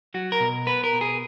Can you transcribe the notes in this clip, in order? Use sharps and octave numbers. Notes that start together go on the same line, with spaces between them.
F#3 F#4
A#4
B2
B3 B4
A#4
B2
G#4